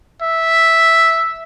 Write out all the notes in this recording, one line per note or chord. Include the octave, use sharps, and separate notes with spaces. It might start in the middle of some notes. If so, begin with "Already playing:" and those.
E5